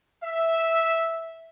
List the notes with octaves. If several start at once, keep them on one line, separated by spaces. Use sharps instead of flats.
E5